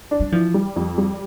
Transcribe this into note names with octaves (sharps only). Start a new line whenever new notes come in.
D4
G3
E3 F3
G3
F2
G3